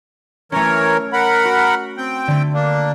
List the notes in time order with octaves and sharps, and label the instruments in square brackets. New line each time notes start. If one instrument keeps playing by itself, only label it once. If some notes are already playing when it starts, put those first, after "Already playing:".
[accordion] E3 A#4 C#5 [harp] A3 C#4
[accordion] A#4 F#5 B5
[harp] F#4
[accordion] C4 G5
[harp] D3 A3
[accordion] A#3 D4